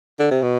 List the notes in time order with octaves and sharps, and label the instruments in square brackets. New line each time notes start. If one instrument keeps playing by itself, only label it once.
[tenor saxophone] D3
C3
B2